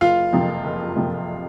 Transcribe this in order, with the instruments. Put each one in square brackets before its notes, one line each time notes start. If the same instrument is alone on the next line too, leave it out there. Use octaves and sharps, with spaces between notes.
[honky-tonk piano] F#1 [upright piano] F4 F5
[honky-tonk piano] F2 C3 F3 A#3
F#1
F2 C3 F3 A#3